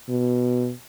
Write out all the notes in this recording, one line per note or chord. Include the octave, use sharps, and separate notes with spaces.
B2